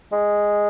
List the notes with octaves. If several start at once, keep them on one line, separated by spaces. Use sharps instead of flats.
G#3